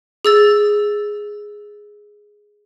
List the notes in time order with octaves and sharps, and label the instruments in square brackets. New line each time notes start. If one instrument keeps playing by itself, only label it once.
[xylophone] G#4 E6 A6